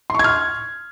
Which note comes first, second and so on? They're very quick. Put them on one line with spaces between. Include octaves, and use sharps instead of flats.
C6 C#6 G#6 F6